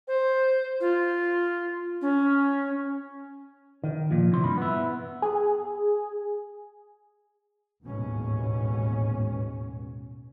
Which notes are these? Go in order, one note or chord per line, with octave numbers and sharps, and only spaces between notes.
C5
F4
C#4
D#3
A#2 F3
C3 E3 C6
G2 B5
B3 E4
G#4
A1 D#2 G#2 B2 C#4